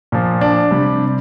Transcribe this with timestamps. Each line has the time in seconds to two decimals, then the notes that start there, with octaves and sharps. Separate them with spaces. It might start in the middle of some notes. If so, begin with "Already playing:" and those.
0.12 A#2 F3
0.41 D4
0.71 C3 G3